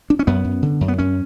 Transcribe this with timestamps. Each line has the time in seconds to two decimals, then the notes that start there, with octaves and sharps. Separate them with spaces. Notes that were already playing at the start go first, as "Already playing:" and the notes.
0.10 D4
0.19 C#4
0.27 F#2 B3
0.45 F#2
0.63 D3
0.81 F#2
0.88 B3
0.98 F#2 C#4